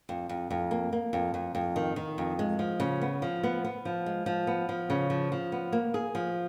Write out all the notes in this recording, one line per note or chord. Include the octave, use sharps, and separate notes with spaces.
F2
F2
F2
A#3
A#3
F2
F2
F2
D#3
D#3
F2
G#3
F3
C#3
B3
F3
B3
B3
F3
G#3
F3
B3
F3
C#3
F3
F3
B3
A#3
G#4
F3